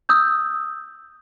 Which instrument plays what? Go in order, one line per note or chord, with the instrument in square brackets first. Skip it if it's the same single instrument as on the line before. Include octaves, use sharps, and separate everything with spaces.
[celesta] D#6 E6 G6